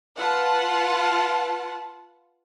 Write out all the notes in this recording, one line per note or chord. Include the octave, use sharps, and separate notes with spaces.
F4 B4 F#5 A5